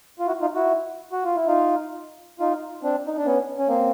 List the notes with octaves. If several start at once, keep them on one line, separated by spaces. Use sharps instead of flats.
F4
E4 F#4
D#4 F4
E4 F#4
F#4
F4
E4
D#4 F4
D#4 F4
C4 D4
D#4
D4
B3 C#4
C#4
A#3 C4